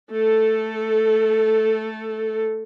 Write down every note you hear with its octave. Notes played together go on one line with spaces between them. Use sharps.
A3 A4